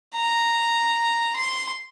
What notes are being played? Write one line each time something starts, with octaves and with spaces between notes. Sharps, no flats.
A#5
C6